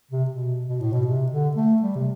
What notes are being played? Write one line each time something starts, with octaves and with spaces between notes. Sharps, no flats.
C3
B2
B2
A2
B2
C3
D3
A3
G3
C3